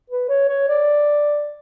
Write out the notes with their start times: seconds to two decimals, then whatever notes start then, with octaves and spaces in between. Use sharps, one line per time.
0.10 B4
0.29 C#5
0.49 C#5
0.69 D5